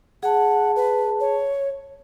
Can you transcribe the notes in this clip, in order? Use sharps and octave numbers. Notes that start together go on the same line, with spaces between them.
G#4 F#5 A5
B4
C#5